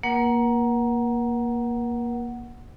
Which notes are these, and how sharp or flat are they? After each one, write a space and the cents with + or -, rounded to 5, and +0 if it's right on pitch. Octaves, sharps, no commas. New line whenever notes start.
A#3 +15 A#4 +45 F#5 +5